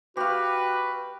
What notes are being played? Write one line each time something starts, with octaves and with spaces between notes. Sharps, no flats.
F#4 G4 B4 F5